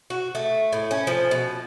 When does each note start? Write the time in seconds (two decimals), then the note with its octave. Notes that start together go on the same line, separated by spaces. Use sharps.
0.10 F#4
0.35 A3
0.73 A2
0.91 C#4
1.07 F3
1.31 B2